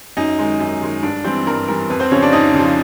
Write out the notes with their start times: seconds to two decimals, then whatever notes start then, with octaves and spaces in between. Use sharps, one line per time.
0.17 F#2 D#4 D#5
0.39 D#3 G#3
0.60 F#2
0.81 D#3 G#3
1.03 G2 D4 D5
1.24 E3 G3 C4 C5
1.47 G2 A#4
1.68 E3 G3 A#4
1.90 F2 B4
2.00 C4 C5
2.11 C#3 F3 C#4 C#5
2.22 D4 D5
2.32 F2 D#4 D#5
2.54 C#3
2.59 F3